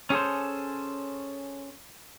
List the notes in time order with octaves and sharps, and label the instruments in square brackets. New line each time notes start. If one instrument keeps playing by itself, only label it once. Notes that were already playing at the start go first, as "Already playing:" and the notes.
[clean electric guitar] C#4 G#4 A4 C5